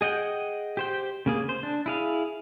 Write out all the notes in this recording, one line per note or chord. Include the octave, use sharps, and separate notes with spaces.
G#4 D#5 F#5 G5
G4 C5 G5
C#3 A#3 G#4
C5
D4
E4 G#4 F5